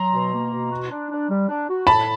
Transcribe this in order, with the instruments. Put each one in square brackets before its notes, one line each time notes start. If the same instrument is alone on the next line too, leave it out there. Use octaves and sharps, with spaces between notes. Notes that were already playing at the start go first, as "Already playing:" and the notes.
Already playing: [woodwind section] F#3 [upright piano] A#5 C6
[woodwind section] B2
A#3
B2
F#4
D4
D4
G3
D4
F#4
[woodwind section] A2 [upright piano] A5 B5